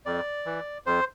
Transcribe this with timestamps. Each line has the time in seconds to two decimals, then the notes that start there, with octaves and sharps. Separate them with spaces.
0.06 F2 D5
0.46 E3
0.86 F2 C5